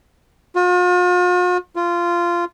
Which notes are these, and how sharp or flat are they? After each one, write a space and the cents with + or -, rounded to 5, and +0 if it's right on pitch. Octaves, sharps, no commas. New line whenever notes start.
F4 +45
F4 -15